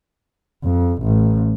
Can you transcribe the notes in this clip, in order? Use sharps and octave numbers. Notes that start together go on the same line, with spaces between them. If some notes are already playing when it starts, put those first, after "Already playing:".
F2
A1